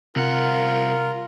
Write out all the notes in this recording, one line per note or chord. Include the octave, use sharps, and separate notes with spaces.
C2 C3 F4 A#4 F#5